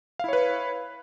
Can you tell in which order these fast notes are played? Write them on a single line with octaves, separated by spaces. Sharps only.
F5 E4 C#5 B4